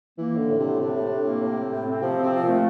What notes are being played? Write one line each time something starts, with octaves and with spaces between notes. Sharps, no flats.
E3 A#3
A2 D3
A2
C3
A2
C3 D4
A2
A2
A#3
A2
C4
A2
C4
C3 F3
C4
C3
F3
A#2
A3